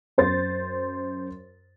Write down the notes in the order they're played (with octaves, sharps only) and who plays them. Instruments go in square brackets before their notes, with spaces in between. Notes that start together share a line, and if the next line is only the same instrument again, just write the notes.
[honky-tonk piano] F#2 C5 C6 A6